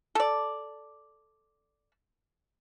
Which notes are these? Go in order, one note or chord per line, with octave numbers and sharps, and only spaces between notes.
A4 D5